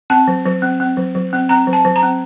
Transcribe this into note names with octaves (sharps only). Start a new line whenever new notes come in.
C4 A5
F#3
F#3
C4
C4
F#3
F#3
C4
C4 A#5
F#3
A5
F#3
A#5
C4